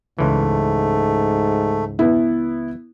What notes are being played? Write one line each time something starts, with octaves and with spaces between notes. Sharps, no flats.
C#2 G#2 E3 A3
B3 E4